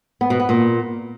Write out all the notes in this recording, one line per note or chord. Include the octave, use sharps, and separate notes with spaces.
B3
B2
B3
A#2